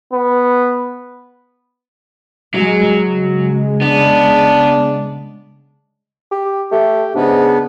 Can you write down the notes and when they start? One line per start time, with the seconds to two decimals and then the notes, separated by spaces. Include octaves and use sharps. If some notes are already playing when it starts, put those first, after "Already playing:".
0.13 B3
2.54 F#3 G#3
3.03 C#3 G#3
3.82 B3 D4
6.32 G4
6.72 A3 G4
7.15 G#2 C#3 B3 D4